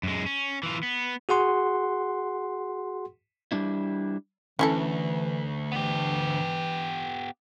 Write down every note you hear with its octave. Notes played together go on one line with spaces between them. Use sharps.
F#2 G#3
C#4
E3 F4
B3
F#4 G#4 F#5 C6
G3 D4 E4
D2 E3 C#4 E4 A4
E3 B3 G4